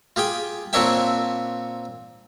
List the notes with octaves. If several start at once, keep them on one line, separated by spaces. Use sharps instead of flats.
F4 G4 G#4 G5
A#2 C4 D4 C#5 E5 G5